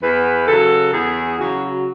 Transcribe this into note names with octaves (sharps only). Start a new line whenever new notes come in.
E2 B4
C#3 F#3 A4
E2 G#4
C#3 F#3 F#4